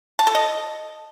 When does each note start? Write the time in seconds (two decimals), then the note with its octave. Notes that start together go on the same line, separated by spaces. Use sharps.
0.19 A5
0.27 A4
0.35 D#5